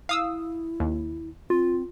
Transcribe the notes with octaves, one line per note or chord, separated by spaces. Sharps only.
E4 F5 D#6 E6
D#2
C4 F4